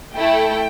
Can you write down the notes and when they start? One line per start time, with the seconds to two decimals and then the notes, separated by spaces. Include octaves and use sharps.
0.13 A3 E4 A4 G5